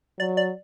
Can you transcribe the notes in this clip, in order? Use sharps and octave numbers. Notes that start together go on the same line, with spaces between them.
F#3 D5
D5